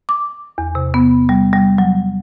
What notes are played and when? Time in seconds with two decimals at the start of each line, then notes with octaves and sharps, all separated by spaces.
0.09 D6
0.58 E2
0.75 C3
0.94 B3
1.29 G3
1.53 G3
1.78 F#3